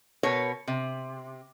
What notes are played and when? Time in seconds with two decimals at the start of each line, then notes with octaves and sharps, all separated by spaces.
0.23 B2 A#4 B4 C#5
0.68 C3